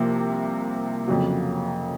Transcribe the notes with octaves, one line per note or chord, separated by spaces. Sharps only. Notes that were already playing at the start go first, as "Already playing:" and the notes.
Already playing: C2 C3 F3 A#3
F2 C#3 F#3